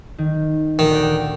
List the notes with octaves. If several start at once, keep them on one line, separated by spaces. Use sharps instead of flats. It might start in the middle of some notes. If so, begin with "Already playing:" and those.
D#3
D2 A#2 D#3
D5 F#5 G5